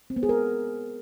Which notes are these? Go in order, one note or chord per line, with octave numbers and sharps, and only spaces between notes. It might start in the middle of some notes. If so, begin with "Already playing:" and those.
C4
B3
G#4
A#4